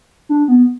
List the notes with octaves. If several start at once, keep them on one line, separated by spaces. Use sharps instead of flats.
D4
B3